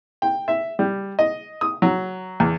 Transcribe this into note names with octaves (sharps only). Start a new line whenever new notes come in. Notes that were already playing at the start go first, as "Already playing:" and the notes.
G5
E5
G3
D#5
D#6
F#3
E2